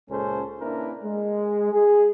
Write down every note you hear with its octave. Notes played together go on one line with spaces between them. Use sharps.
C#2 A#2 G#3 C#4 A4 C5
A#3 C#4 D4 E4 A#4 B4
G#3
G#4